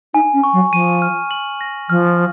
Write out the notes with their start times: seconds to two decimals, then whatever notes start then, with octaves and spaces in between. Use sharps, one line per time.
0.14 D#4 G#5
0.34 C#4
0.43 C#6
0.53 F#3
0.72 F3 D#7
1.02 F6
1.31 F#7
1.61 A#6
1.90 F3 F6